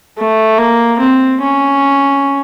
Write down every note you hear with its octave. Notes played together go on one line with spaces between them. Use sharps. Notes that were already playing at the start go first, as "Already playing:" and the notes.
A3
A#3
C4
C#4